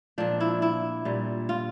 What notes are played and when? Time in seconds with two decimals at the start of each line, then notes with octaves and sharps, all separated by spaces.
0.18 A#2 F3 D4
0.40 E4
0.62 E4
1.05 A#2 G3
1.49 F4